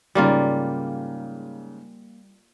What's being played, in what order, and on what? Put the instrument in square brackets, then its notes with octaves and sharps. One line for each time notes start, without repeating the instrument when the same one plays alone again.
[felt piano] G#2 C#3 [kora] G3 A#3 F4